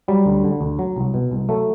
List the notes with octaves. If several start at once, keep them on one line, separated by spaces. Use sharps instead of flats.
F#3 G3
D2
D3
D2
F#3
C2
B2
C2
F#3 A3